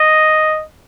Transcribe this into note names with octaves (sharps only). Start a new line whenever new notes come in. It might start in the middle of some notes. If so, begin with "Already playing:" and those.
Already playing: D#5